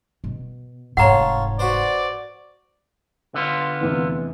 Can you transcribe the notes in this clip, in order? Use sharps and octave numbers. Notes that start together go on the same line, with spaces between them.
B2
F1 G#2 F4 A4 C#5 F#5 A#5
F#4 B4 C5 D5
D3 B3 F4
F1 E2 E3